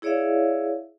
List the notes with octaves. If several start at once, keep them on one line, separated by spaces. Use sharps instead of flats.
E4 G#4 C#5 D5 E5 F5